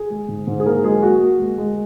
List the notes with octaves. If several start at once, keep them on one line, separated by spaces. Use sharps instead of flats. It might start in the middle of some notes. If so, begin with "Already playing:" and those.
Already playing: G#4
G#3
G#2
G#2
G#4
A#3 A#4
F#3 G#3 G#4
A#3 F#4
A#3
G#3
G#3